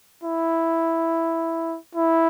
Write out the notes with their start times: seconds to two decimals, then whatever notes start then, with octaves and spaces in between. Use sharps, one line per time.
0.23 E4
1.95 E4